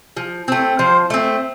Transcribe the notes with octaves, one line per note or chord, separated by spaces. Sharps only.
F3
A3 C4
F3 C5
A3 C4